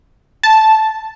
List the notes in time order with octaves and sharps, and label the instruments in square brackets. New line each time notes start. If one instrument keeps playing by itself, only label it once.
[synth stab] A5